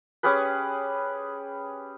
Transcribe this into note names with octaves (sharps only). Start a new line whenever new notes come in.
C#4 G4 G#4 B4